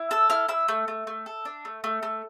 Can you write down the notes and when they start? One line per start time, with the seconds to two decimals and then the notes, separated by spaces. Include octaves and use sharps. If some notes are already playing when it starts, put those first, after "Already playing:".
Already playing: E4
0.11 A4 E6
0.30 E4 F6
0.48 E4 E6
0.68 A3
0.88 A3
1.07 A3
1.26 A4
1.45 D4
1.65 A3
1.84 A3
2.03 A3